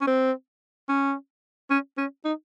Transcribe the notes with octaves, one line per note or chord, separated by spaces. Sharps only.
C#4
C4
C#4
C#4
C#4
D#4